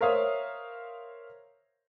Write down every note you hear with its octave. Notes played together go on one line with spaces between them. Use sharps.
A#4 C5 C#5 E5 F5 D#6